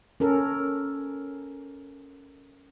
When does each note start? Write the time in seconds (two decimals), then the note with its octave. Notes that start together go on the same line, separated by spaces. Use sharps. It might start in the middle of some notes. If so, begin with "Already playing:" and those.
0.20 C#4 A4 A#4